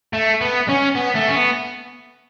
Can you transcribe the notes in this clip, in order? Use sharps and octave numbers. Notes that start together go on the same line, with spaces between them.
A3
B3
C#4
B3
A3
C#4
B3